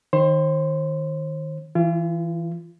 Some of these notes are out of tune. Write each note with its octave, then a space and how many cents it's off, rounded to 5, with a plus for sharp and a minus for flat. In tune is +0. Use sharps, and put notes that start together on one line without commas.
D#3 +0 C5 +35 C6 -25
E3 +0 F4 -35